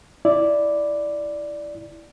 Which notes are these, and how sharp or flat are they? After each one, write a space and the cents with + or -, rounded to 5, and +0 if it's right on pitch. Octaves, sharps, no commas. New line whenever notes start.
E4 +0 D5 +0